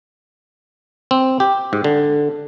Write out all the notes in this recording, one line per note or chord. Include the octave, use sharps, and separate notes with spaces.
C4
G4
G#2
D3